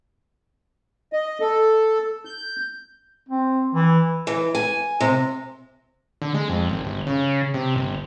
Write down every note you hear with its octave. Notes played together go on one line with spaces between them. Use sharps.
D#5
A4
G6
C4
E3
E3
G#5
C3
D3
G#3
F2
G#1
G1
C#3
C3
G1